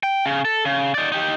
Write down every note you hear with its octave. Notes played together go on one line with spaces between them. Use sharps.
G5
C#3
A4
C#3
D#4 D5
D#4 G4